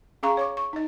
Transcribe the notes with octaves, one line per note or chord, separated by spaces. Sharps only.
C#4 G#4 F5 A#5 C#6
C#5 C#6 D6
C#6
D#4 D#5